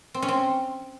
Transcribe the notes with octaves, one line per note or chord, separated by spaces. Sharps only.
C4
C#4
C4